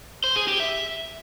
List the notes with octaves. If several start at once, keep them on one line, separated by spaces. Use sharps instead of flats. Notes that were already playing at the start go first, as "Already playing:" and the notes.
C5
G#4
G4
E5